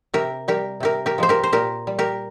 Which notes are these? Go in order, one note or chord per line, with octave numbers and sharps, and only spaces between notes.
C3 G4 A#4
G3 G4 A#4
C3 G4 A#4
G4 A#4
F3 G#3 C5
G4 A#4
C5
A#2 G4 A#4
G3
G4 A#4